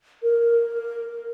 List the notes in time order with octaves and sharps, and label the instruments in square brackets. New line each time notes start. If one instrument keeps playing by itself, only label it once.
[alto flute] A#4